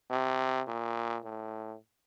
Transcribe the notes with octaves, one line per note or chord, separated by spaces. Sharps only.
C3
A#2
A2